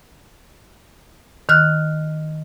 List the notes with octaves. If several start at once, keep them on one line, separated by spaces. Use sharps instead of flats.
D#3 F6 F#6